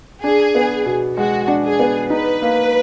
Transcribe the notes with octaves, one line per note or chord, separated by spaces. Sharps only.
D4 G#4
B3
B2
G#3 F#4
D4
G#4
B3
D#4 B4
A#3